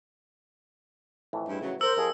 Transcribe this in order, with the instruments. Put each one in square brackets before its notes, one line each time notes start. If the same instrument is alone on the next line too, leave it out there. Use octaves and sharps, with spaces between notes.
[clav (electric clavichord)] F2 A2 E3
[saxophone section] G2 G#3 E4
C#3 F#3
[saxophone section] A#4 [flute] C5 [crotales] E6
[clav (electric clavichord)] F2 F3 [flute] G#4